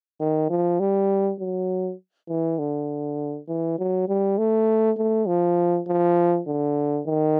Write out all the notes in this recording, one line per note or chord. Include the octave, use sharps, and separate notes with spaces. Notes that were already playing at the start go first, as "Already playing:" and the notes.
D#3
F3
G3
F#3
E3
D3
E3
F#3
G3
A3
A3
F3
F3
D3
D#3